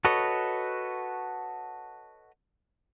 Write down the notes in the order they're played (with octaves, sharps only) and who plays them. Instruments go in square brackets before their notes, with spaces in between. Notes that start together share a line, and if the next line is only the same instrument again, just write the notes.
[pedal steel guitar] F#4 A4 B4 C#5 D#5